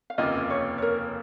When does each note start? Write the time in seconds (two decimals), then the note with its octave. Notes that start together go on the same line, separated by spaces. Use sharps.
0.10 F5
0.18 F1 D#2 C#3 A#3 F4 D#5
0.50 C#5
0.78 C#5
0.82 A#4